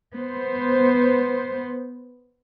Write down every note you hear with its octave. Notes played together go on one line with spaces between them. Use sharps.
B3 C5